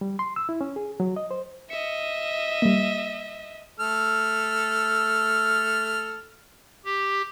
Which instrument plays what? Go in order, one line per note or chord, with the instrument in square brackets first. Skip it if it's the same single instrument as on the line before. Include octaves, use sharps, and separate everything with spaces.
[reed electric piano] G3
C6
E6
E4
C#4
G#4
F#3
D#5
C5
[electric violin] D#5 E5 [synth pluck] C#7
[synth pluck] G3 A#3
[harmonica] A3 A4 F6
[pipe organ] G4